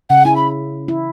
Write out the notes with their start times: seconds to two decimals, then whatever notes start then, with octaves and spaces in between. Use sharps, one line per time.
0.09 C#3 F#5
0.25 E4 G#5
0.36 B5
0.88 E4